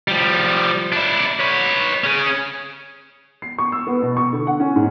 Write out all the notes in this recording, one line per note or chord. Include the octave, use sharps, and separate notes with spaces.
F3 G3
D4 E4
B4 C#5
C#4 G#4
C7
C#6
E6
B3
B2
C#6
D3
F#5
C#4
G#2